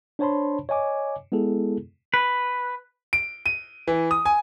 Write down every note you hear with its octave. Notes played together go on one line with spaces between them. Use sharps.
D4 C5 C#5 A5 B5 C6
C#5 D#5 G#5 D6
G#3 B3 E4 G#4 A4
B4
D7
D#7
E3
D#6
G#5